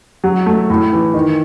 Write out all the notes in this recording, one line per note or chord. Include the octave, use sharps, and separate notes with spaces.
F#3
A3
A2
E3
D#3